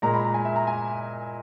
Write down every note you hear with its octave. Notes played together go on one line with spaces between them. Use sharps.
A#2 G#3 A#5
B5
A#5
G#5
E5
A#5
G#5